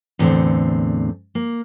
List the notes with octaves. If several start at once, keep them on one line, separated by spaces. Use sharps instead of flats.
E2 A2 D3 C4
A#3